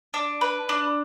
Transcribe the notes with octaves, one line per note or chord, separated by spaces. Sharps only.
D4
B4
D4